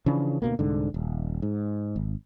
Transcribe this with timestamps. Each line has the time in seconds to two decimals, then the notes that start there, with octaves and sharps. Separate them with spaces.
0.06 C#3 E3 F3 D4
0.42 D2 B2 A#3
0.59 C2 G#2 D3
0.94 D#1
1.42 G#2
1.96 G#1